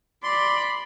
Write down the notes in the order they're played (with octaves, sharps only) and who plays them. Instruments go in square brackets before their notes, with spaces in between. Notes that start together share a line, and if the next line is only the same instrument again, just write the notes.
[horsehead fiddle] D5 [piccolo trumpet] B5 [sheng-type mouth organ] C6